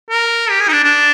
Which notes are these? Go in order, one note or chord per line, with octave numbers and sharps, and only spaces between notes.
A#4
G4
G#4
D#4
D4
D4